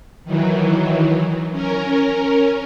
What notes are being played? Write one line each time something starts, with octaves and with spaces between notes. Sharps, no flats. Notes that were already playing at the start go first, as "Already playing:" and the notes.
D#3 E3 F#3
C#4 A#4